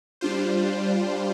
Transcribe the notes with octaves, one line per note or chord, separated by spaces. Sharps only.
G3 D4 F4 C5